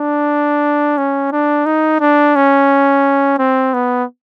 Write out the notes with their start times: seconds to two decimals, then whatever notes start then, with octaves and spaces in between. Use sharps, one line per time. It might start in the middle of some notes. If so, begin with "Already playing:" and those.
Already playing: D4
0.98 C#4
1.32 D4
1.66 D#4
2.00 D4
2.36 C#4
3.39 C4
3.74 B3